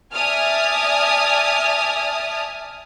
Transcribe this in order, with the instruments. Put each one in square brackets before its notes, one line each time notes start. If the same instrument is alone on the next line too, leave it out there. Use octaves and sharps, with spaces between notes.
[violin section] D5 E5 G#5 A5 D#6 F6